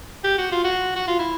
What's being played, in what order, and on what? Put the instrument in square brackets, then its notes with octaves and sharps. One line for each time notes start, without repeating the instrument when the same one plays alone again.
[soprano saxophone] G4
F#4
F4
F#4
F#4
F4
E4